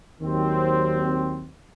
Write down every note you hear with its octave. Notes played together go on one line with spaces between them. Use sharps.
D#2 D#3 F#3 C4